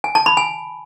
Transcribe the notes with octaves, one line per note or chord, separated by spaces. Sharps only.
G#5
A5
B5
G#5